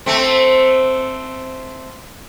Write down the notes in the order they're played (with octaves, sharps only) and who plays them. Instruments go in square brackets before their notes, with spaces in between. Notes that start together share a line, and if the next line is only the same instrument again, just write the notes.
[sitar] A3 C4